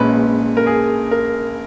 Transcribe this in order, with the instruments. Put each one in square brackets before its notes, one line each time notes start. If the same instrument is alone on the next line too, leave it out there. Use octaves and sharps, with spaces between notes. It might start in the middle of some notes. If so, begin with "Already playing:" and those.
Already playing: [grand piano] A#1 A#2 G#3 C#4 B4
A#4
G#4
A#4